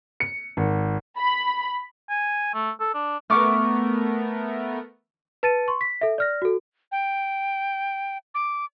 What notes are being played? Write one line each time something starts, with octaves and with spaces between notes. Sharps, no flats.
C#7
G#1
B5
G#5
A3
A4
D4
A3 B3 A#4 C#6 D6 F6
B4 A5 A6 C#7 D#7
C6 C#6
B6
A4 E5
D5 F6 A#6
F#4 A4
G5
D6